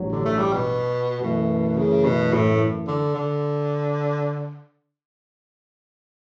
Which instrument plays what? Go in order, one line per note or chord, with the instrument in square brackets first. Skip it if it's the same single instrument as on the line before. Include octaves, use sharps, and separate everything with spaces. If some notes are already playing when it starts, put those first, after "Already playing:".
Already playing: [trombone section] A1 G2 F#3
[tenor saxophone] D3
A3
G3
B2
[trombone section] F#2 E3 A3 [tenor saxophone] B2
[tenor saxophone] C#3
B2
A2
D3
D3